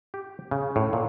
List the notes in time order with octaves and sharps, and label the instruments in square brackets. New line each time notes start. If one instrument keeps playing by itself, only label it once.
[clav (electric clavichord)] G4
C#3
A2
A#2